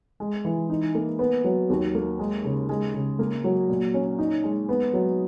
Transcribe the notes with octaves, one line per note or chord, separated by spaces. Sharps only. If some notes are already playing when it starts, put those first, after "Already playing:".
G#3
E3
D#4
A#3
B3
F#3
D#2
A#3
G#3
C#3
G#3
C#3
A#3
F#3
A#2
C#4
D#4
G#3
B3
F#3